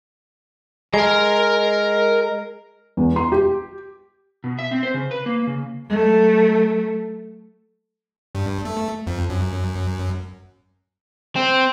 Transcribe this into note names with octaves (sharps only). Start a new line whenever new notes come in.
G#3 A#4 A#5
E2
C6
G4
B2
E5
C4
C5
C#3
B4
A#3
C#3
F#3 A3
G2
A3
F2
F#2
C4